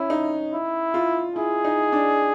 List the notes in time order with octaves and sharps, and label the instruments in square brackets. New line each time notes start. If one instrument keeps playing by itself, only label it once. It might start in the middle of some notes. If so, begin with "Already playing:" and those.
Already playing: [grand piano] C#4 [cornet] E4
[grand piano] D#4
[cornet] E4
[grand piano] F4
[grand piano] E4 [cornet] G#4
[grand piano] D#4
D4